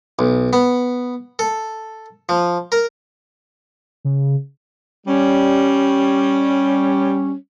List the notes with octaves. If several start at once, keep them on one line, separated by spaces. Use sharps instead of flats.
B1
B3
A4
F3
A#4
C#3
G3 C#4